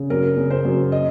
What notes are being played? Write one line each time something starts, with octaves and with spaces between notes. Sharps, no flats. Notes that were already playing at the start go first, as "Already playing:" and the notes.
Already playing: C#3
F#2 A#4
C#3
C5
F#2
D#5